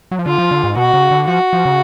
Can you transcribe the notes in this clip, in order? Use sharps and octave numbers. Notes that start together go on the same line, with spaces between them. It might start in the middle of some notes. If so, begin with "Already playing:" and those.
F#3
F3
D3 F4
F3
D3
G#2
B2 F#4
C#3
D3
F3 F#4
F3
C#3